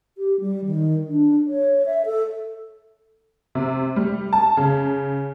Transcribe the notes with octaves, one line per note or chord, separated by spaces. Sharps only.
G4
G3
D#3
D4
C#5
E5
A4
C3
G3
A5
C#3